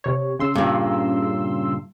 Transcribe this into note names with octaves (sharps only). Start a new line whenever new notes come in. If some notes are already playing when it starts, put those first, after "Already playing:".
C3 C#5
C#3 C6 E6
G2 A#2